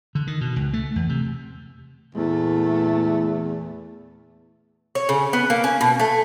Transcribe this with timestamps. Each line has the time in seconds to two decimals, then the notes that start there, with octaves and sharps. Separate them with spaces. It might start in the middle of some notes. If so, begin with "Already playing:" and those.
0.15 D3
0.27 D#3
0.41 B2
0.56 C#2
0.73 A3
0.96 E2
1.09 C3
2.15 E2 A#2 A3
4.95 C#5
5.09 C#3
5.33 B3
5.50 A#3
5.64 C#4
5.81 B2
6.00 A3